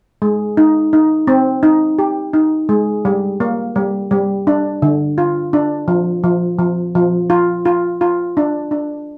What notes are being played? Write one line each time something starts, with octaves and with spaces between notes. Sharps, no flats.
G#3
D#4
D#4
C4
D#4
G4
D#4
G#3
G3
A#3
G3
G3
D4
D3
F4
D4
F3
F3
F3
F3
F4
F4
F4
D4
D4